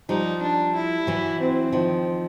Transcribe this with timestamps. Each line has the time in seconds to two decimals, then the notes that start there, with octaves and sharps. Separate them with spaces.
0.09 F3 G3 D#4
0.42 D4
0.75 E4
1.07 E3 F#3
1.40 C4
1.72 D#3 F3